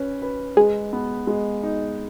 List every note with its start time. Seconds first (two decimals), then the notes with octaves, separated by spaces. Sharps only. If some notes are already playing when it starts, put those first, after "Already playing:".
Already playing: C#4 B4
0.22 B4
0.57 G#3 G#4
0.93 B3
1.27 G#3
1.63 D#4